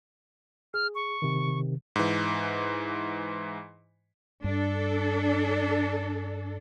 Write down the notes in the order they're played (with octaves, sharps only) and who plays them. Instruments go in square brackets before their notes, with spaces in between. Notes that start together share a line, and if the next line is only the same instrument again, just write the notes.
[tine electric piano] G#4 [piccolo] F6
[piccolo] C#6
[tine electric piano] C3 D#3
[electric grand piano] G#2 E3
[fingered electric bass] G2 [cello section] D4 A4